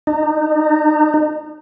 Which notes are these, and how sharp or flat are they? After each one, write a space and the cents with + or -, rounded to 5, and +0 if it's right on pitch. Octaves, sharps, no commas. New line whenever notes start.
D#4 -35